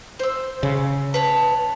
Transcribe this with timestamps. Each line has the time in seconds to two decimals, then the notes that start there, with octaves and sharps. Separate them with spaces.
0.19 C5 E6
0.63 C#3
1.14 B4 C#5 A5